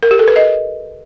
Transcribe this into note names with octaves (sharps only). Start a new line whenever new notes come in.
A#4
G4
A4
B4
D#5